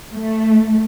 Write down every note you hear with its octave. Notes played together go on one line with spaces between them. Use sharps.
A3